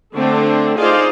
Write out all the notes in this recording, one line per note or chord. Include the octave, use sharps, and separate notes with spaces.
D3 A3 C4 D4 A4 C5
D#4 F4 G#4 C5 D5 F5